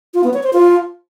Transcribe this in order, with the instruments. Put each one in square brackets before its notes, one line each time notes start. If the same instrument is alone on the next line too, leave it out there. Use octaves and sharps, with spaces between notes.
[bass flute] F4
B3
C#5
C5
F4